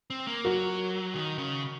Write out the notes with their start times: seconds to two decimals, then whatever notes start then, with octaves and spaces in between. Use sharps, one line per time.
0.10 C4
0.27 A#3
0.45 F#3 F#4 A#4
1.15 D#3
1.38 C#3